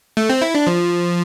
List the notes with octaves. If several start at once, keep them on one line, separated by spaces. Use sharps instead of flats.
A3
C4
E4
D4
F3